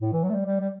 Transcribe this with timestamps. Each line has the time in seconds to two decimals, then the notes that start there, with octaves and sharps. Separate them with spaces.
0.01 A2
0.13 E3
0.24 F#3
0.29 A3
0.34 G3
0.46 G3
0.61 G3